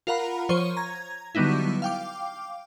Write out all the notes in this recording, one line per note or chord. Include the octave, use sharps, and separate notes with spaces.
F4 A#4 F5 F#5 A#5 B5
F3 C5 C#5 C#6 D#7
A#5 G#6
D3 F#3 G3 B3 D#4 E4
F5 G5 D6